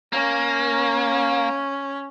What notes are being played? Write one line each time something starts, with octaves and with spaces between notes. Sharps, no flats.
A#3 C#4